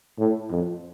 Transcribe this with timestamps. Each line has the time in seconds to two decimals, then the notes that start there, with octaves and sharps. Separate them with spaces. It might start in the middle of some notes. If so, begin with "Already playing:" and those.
0.19 A2
0.51 F2